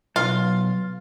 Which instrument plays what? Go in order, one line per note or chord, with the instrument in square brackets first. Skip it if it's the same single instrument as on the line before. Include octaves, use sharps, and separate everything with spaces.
[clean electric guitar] B1 [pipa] F4